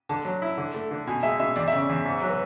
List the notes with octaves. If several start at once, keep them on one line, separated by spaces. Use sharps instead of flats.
D3 A5
F#3
E4
D3
A3
D3
B2 G#5
G#3 E5
B2 E5
E2 D5
C#3 E5
D5
E2
G#2
F#3
B4